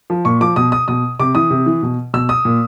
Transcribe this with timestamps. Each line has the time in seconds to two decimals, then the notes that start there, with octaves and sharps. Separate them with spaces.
0.10 F3
0.25 A#2 C#6
0.41 F3 D6
0.56 B2 D#6
0.72 D#6
0.88 B2 D#6
1.19 C3 D6
1.35 E3 D#6
1.50 C3
1.66 E3
1.83 B2
2.14 B2 E6
2.29 D#6
2.45 A#2